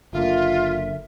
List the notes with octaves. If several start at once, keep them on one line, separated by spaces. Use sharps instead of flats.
F#1 D3 A#3 F4 E5